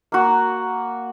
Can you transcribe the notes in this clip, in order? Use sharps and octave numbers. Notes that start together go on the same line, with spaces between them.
A#3 F#4